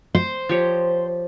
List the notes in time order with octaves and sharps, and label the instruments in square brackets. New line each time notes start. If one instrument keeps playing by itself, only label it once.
[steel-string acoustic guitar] C5
[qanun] F3 G4 C#5